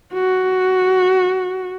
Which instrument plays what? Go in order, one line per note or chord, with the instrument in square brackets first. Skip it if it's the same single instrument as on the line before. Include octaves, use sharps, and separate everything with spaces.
[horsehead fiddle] F#4